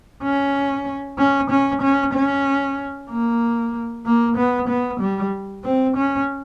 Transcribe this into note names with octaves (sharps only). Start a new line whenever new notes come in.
C#4
C#4
C#4
C#4
C#4
A#3
A#3
B3
B3
G3
C4
C#4